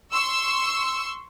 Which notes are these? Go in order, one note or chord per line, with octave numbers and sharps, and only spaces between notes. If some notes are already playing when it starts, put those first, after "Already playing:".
C6 C#6 E6